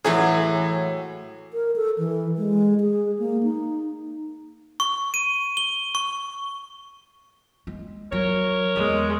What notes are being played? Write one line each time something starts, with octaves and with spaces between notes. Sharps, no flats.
A2 E3 F#3 G#4
A#4
A4
E3
G#3
G#4
A#3
D#4
C#6
D#7
G7
C#6
G#3
F#3 A#4 C#5
E2 G#3